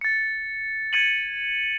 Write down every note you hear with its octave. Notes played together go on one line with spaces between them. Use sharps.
A6 C#7
G#6 A6 C#7 D#7 F#7